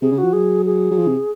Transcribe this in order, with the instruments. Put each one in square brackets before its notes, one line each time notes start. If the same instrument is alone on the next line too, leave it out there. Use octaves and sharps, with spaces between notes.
[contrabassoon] C3 [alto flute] G#4
[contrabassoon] C#3
[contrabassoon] F3 [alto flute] F#4
[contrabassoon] F#3 [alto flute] G#4
[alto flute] G#4
[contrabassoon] F#3
F3
C3